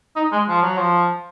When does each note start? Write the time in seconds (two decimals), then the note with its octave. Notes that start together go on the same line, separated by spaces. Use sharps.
0.16 D#4
0.32 G#3
0.49 F3
0.62 F#3
0.77 F3